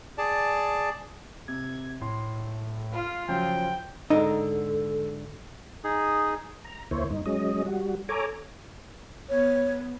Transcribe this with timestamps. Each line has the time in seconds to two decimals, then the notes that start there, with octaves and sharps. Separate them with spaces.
0.18 G#4 D5 A5
1.48 C3 G#6
2.01 A2 C6
2.93 F4 F5
3.28 C#3 F3 F#3 G5
4.10 G#2 D3 D#4 A4 D#5
5.84 D#4 G#4
6.64 A#5
6.91 D2 A#3 E4 C5 C#5
7.10 G2 D#4
7.26 F#3 G#3 C#4 D#5
7.66 G3 F#4
8.09 A4 C#5 G#5 A#5 D6
9.29 B3 C#5